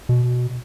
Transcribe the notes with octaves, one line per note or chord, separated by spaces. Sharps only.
B2